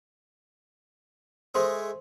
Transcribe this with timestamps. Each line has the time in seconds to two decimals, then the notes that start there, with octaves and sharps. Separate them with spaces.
1.54 G#3 A3 G#4 A#4 C5 C6